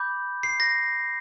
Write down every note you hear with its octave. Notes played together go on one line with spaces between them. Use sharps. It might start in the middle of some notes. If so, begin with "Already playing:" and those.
Already playing: B5 D6 G6
C7
A#6